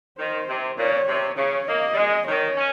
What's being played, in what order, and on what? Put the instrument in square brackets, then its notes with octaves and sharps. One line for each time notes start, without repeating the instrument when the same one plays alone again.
[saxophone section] D#3 [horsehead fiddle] C5
[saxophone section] C3
[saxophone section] A#2 [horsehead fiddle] C#5
[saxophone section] C3
[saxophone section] C#3 [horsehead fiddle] C#5
[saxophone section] A#3 [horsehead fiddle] D#5
[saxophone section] G3
G#3
[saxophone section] D#3 [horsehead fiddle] C#5
[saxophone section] C#4